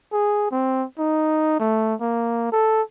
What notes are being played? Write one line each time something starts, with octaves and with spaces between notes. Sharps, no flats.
G#4
C4
D#4
A3
A#3
A4